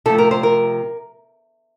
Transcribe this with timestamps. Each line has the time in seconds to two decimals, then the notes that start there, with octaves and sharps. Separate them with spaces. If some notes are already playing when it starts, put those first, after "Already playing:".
0.06 C3 F3 A3 A4
0.18 A#4
0.31 C5
0.43 A#4